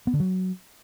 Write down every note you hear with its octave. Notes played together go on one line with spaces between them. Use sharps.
B3
D3
F#3